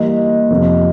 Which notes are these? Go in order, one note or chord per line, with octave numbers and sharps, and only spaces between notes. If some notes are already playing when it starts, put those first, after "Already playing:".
Already playing: E3 G3 A#3 D#5
F2 C3 F3